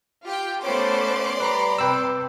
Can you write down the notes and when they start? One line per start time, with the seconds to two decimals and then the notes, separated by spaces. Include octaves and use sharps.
0.24 F4 G4 G5
0.63 A3 B3 C#4 C5 D5 C6 D6
1.40 G3 B4 A#5 B5
1.78 C3 B4 G5 E6